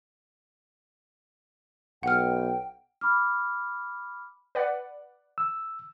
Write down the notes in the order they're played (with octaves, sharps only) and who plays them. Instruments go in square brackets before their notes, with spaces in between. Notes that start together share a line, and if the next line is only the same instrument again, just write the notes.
[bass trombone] B1 [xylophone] F#5 F6 [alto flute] G5
[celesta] B5 D6 F6
[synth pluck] B4 D5 F#5
[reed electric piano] E6